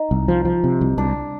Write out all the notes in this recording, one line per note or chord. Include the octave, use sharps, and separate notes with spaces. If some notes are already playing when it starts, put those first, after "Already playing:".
Already playing: D#4
C2
F3
F3
C3
C2
C2 D4